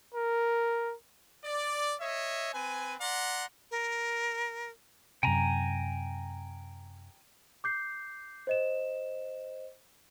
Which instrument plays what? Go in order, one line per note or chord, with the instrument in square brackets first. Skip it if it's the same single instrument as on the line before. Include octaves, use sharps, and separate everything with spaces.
[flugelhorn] A#4
[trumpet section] D5
C#5 D#5 E5
C4 B4 G#5
D5 F#5 A#5 C6
[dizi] A#4
[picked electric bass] F#2 C3 [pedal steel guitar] G5 G#5 A#5
[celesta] D6 G6 C7
C5 D#5 E7